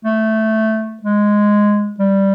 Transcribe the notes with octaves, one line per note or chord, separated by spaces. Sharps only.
A3
G#3
G3